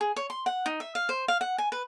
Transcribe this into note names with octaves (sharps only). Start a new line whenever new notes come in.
G#4
C#5
C6
F#5
D#4
E5
F5
C5
F5
F#5
G#5
B4